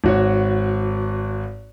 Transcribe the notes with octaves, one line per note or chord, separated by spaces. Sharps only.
G#1 F#4 C#5